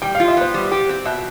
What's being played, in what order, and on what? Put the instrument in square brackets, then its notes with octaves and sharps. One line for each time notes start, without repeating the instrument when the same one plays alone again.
[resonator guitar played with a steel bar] G3 [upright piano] G5
[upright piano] F5
[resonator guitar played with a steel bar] F4
[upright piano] E5
[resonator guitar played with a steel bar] B3 [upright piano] C5
[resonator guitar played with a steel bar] G3
G4
C4
[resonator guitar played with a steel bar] B2 [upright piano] E5